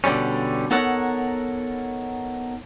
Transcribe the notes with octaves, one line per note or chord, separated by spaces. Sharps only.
B2 D3 G3 C#4
B3 D#4 A4 A#4 C#5 F#5